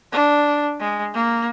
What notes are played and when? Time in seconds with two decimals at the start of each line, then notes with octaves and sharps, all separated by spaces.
0.12 D4
0.80 G#3
1.14 A#3